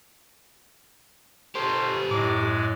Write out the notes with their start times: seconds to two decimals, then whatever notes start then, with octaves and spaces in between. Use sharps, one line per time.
1.55 B2 G4 A4 C5
2.11 F#2 A2 F#3 G#3 D6